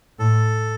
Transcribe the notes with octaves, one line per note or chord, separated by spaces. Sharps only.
A2 A4